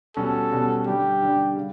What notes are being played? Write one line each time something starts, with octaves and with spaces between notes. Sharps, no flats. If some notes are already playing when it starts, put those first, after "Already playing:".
B2 G3 C#4 F#4 A4
B2 G3 C#4 F#4
D3 G3 D4 G4
D3 G3 D4
C#3